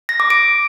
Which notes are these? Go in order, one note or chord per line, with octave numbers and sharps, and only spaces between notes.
A#6
D6
D7